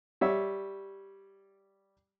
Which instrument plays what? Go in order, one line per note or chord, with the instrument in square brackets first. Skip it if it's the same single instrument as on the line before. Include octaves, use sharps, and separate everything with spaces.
[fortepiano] G3 C#5 E5